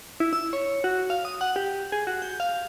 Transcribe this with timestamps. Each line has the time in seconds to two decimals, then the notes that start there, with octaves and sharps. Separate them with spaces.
0.20 E4
0.33 E6
0.53 C#5
0.84 F#4
1.10 F5
1.25 D#6
1.41 F#5
1.56 G4
1.92 G#4
2.07 F#4
2.22 G6
2.40 F5